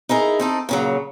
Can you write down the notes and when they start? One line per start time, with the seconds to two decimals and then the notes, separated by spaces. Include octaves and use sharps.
0.09 D#4 E4 G#4 A#4
0.40 C4 D#4 A4
0.69 A#2 C#3 F#3